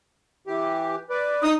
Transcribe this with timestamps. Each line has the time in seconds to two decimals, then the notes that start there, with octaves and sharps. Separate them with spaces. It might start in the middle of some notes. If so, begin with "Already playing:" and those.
0.47 E3 G4
1.10 B4 D5
1.43 D#4 D#6